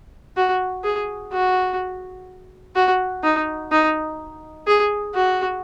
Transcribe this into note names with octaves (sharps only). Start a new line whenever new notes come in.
F#4
G#4
F#4
F#4
D#4
D#4
G#4
F#4